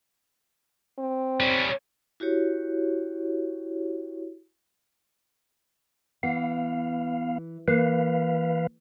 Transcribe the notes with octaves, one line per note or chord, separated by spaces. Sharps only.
C4
G3 C#4
E4 F#4 G4 C#5
E3 B3 F5
E3 A#3 B4 F5